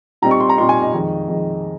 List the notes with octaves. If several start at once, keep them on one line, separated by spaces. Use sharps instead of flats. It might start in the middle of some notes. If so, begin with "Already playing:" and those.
A#2 G3 C4 D#4 A#5
C#6
C6
A#5
A#2 G3 C4 D#4 C6
G#5
D#5
F2 D#3 G#3 D#4
F2 D#3 G#3 D#4